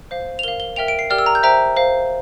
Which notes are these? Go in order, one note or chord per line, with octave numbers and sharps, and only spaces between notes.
C5 F5
F7
A#4 F5 G7
G7
A#4 E5 G5 F7
D7
C7
G4 A#4 D5 G5 F6
E6
A#5
G6
C5 E5 G5 A#5
C5 F5